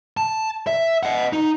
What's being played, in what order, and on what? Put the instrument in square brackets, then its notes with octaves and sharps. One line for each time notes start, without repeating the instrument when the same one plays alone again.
[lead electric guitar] A5
E5
D#5 F#5
D#4